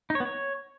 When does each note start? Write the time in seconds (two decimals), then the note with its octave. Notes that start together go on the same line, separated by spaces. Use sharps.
0.10 D#4
0.15 C#5
0.20 B3
0.25 C#5